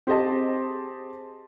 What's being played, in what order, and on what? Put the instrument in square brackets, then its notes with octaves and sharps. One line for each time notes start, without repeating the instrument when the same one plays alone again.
[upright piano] C4 G4 G#4 C5 D#5 A5